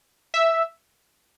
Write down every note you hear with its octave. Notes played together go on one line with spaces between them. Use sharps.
E5